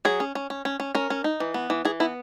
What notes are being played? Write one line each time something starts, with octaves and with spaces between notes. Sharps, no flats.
F#3 G#4
C#4
C#4
C#4
C#4
C#4
C#4 A#4
C#4
D#4
E3
B3
E3
E3 G#4
B3 E4